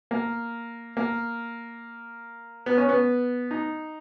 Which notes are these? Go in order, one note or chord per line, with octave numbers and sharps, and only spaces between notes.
A#3
A#3
B3
C#4
B3
D#4